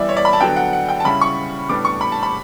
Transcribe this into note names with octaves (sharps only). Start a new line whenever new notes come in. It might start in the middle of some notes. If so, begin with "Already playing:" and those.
Already playing: E3 G3 B3 E4 D5 E5
C#5
D5
B5
A5
D3 F#3 B3 D4 G5
F#5
F#5
G5
A5
C#3 G3 C#4 E4 B5
C#6
A2 G3 B3 D4 D6
C#6
B5
A5
B5